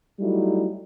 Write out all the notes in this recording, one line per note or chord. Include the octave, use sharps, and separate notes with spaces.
F#3 G3 A3 D#4 E4